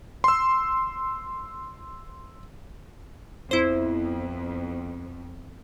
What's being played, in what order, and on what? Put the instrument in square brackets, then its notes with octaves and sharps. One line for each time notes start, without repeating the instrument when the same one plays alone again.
[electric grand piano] C6 E6
[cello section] F2 B3 [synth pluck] E4 C5